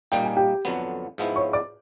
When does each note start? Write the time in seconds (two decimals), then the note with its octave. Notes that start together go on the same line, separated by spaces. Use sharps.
0.12 A#2 G3 A#3 D#4 G5
0.24 G#5
0.37 G4 G5
0.65 F2 D3 F#3 B3
1.18 G#2 F3 G#3 B3 E4
1.36 C#5 C#6
1.53 D5 D6